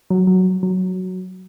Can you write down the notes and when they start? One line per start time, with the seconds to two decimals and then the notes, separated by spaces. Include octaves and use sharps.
0.10 F#3
0.27 F#3
0.63 F#3